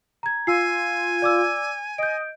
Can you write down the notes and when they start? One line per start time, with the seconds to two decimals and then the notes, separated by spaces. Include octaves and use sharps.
0.23 A#5 G#6
0.47 F4 G#5 E6 C7
1.22 D5 D6 E6
1.98 D#5 G6 D7